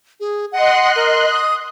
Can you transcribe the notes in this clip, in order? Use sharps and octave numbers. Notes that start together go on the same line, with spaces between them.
G#4
D#5 F#5 C6 F#6
A#4
D#6